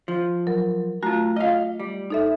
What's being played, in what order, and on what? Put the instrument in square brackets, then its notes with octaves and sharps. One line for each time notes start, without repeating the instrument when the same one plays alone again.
[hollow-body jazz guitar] F3
[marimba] F#3 A#4
[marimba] A3 F#4 [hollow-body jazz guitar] F4 A#5
[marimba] F4 [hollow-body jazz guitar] D#5 F5
[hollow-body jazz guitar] G3
[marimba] D#4 A4 E5